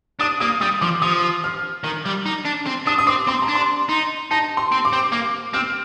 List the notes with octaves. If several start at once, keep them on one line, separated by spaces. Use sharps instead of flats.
D4 D#6
A#3 D#6
G3 D#6
F3 D6
F3 D#6
F6
D#3
G3
D#4
D4
C4
D4 D#6
D#6
C4 D6
C4 C6
A#5
D4
C6
D#4
D#4 A5
C6
C4
D6
C4
A#3 D6
C4 F6